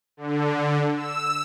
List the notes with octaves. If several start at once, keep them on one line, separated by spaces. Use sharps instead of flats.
D3
E6